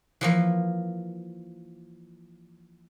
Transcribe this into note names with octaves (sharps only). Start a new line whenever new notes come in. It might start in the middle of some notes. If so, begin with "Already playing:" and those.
E3 F3 A#3